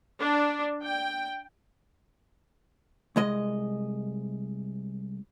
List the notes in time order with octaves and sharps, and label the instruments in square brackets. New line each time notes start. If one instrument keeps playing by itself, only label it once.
[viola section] D4
G5
[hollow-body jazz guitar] C2 G#3 D#5